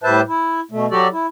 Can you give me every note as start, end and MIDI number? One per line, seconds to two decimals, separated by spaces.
0.04 0.21 45
0.04 0.21 55
0.04 0.21 71
0.04 0.21 72
0.04 0.21 76
0.04 0.21 81
0.28 0.60 64
0.71 0.87 47
0.71 0.87 57
0.91 1.08 54
0.91 1.08 66
0.91 1.08 67
0.91 1.08 69
0.91 1.08 74
1.13 1.26 64